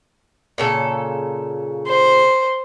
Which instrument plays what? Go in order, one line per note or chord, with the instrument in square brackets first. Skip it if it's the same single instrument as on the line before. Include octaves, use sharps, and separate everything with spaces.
[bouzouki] A#2 C#3 A4
[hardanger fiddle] C5